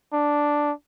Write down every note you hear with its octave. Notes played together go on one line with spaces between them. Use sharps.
D4